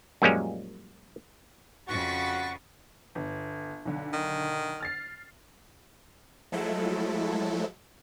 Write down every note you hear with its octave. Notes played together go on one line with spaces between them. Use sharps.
F#2 A#2 F3 G3 G#3 C#4
F2 C#3 F#4 F#5 C#6 A6 B6
G1
B1 D3
D#3
F6 A6 C7
F3 F#3 G#3 A3 E4 A4